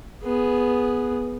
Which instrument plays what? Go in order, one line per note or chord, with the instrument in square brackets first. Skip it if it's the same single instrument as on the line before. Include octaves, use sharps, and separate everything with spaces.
[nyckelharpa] B3 G#4